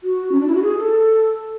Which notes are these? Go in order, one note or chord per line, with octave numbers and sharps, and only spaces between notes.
F#4
C#4
D4
E4
F#4
G#4
A4